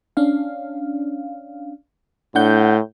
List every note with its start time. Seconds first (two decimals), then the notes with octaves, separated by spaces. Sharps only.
0.17 C#4 D4 F5
2.35 A2 D4 F#5 G6